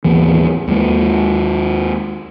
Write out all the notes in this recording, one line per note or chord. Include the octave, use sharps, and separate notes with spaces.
A1 D#2 E3
D#2 G#3